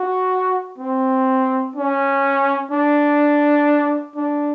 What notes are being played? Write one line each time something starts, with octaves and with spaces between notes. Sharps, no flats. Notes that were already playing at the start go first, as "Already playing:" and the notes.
Already playing: F#4
C4
C#4
D4
D4